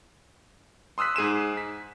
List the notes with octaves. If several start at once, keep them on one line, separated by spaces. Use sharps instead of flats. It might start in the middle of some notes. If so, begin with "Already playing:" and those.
C6 D#6 E6 F#6 B6
G#2 G#4 D#7 E7
B6